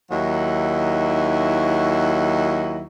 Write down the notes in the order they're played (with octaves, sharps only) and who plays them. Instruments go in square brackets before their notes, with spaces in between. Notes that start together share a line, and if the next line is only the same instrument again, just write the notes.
[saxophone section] D#2 F#3 D#4 E4